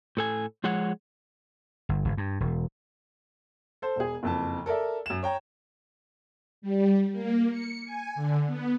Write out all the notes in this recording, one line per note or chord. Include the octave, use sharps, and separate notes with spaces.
A2 A4 G#5
F3 G#3 G#4 C#5 F#5
G1
G1
G2
E1
A4 C5
E1 G#4
F#1 F2 A5
A4 A#4 D5 E5
F#2 E7
C#5 G5 A#5
G3
A#3
C#7
G#5
D3
B3